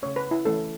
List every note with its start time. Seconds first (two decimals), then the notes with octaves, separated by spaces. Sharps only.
0.03 C#3 A3 C#4 C#5
0.16 B4
0.31 E4
0.45 E3 A3 C#4 A4